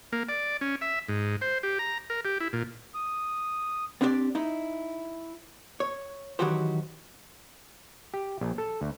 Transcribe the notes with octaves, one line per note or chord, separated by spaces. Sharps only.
A#3
D5
C#4
E5
G#2
C5
G4
A#5
A#4
G4
E4
A#2
D#6
B3 C4 D4 E4 G4 D5
D#4 E4
C#5
D#3 E3 F#3 F#4 G4 C5
G4
A#1
A4
D2